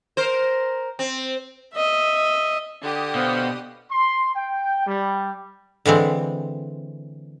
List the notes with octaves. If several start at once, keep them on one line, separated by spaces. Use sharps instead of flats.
A#4 C5
C4
D#5 E5
D3 G4 D#6
B2 C5 F5 F#5
C6
G5
G3
D3 E3 G#3 C4